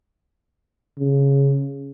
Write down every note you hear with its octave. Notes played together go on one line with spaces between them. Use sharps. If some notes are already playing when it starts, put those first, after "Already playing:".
C#3